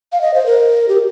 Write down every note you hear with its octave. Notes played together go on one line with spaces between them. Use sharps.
F5
D#5
C5
A#4
G4